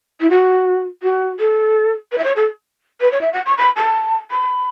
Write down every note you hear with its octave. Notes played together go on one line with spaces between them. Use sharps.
E4
F#4
F#4
A4
B4
E5
C#5
A4
B4
C#5
E5
F#5
C#6
B5
A5
B5